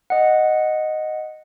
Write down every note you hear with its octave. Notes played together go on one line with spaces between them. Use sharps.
D#5 F#5